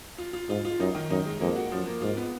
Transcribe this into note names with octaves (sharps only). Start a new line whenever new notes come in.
F4
F4
G#2 F4
F4
F#2 D#4
D#3
F#2 D#4
G#3
F2 A#3
F#4
F#2 F3
A#3
G#2 F4
B3